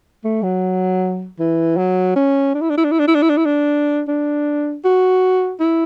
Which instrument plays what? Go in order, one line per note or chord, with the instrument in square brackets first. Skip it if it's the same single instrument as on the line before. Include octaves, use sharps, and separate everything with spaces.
[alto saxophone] A3
F#3
E3
F#3
C#4
D4
E4
D4
E4
D4
E4
D4
E4
D4
E4
D4
E4
D4
D4
F#4
E4